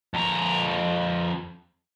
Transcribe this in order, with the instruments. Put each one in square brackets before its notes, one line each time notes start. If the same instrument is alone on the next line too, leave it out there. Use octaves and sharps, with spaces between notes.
[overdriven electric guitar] F2 A#5